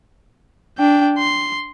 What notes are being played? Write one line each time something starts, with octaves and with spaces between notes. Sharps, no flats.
D4 G5
C6